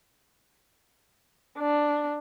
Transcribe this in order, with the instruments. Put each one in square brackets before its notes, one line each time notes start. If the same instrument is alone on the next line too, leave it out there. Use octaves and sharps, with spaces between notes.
[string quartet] D4